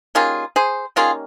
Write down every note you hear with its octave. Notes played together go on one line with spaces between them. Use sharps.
D#3 G3 A#3 C#4 F4 G#4
G#4 C5
D#3 G3 A#3 C#4 F4 G#4